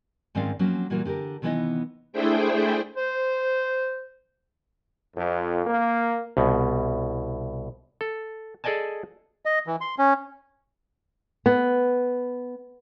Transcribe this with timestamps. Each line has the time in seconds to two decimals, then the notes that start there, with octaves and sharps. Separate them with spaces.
0.35 G#2 D#3 C4 C#4 D5 F5
0.59 F3 F#3 A#3 C4 C#4
0.90 A#2 E3 G3 A#3 F#4
1.05 D3 G4 A4 A#4
1.42 C3 D#3 E3 B3 E4 D#5
2.13 A3 D4 E4 G#4 C5 G5
2.97 C5
5.16 F2
5.66 A#3
6.37 C2 B2
8.01 A4
8.64 G#4 A4 D5 D#5 G#5 A5
9.45 D#5
9.67 E3
9.81 C6
9.98 C#4
11.46 B3